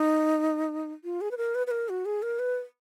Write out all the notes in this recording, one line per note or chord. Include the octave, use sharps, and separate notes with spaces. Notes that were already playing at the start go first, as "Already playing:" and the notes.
Already playing: D#4
F4
G#4
B4
A#4
B4
B4
A#4
F#4
G#4
A#4
B4